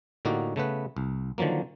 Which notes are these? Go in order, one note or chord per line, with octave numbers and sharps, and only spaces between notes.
A2 D3 A#3 D#4 F#4 G4
C#3 A3 B3 B4
C2
D3 D#3 F3 F#3 A#3